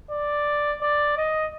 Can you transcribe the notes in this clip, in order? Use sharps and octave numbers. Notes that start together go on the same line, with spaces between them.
D5
D5
D#5